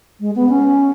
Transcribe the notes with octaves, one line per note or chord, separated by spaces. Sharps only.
G#3
B3
C#4